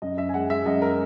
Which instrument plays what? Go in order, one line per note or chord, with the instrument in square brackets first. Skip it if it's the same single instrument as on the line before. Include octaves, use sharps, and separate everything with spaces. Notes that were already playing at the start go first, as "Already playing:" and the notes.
[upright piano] F#2 D#5
F#2 E5
G#5
G#3 F#5
G#3 E5
F#2 D#5
A#4